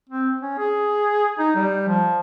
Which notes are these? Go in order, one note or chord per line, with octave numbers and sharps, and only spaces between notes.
C4
C#4
G#4
D#4
G3
F3